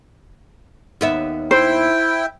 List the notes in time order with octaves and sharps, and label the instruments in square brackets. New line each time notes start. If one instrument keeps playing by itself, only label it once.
[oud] D#2 B3 E5
[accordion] E4 G5 [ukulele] C5